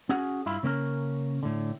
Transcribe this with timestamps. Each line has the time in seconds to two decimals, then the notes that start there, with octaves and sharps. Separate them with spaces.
0.09 C#4 F#4 G#4 F#5
0.46 G2 E4 F4 B5
0.63 C#3 A#3 C#4 A#4
1.43 A2 D3